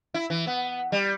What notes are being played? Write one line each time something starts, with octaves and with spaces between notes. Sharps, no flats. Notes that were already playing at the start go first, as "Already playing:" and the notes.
E4
E3
B3
G3